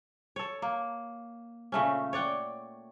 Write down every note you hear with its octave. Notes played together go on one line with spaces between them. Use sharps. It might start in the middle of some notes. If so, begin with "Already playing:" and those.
A4 C#5
A#3
A#2 C#3 A3 C#4
C#5 D5 F#5 G5